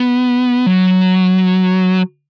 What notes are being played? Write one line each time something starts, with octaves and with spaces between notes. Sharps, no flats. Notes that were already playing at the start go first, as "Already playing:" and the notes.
Already playing: B3
F#3